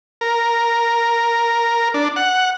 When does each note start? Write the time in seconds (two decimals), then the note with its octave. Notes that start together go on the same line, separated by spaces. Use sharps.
0.21 A#4
1.94 D4
2.16 F#5